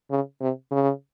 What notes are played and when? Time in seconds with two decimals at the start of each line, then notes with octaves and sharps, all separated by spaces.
0.11 C#3
0.41 C3
0.72 C#3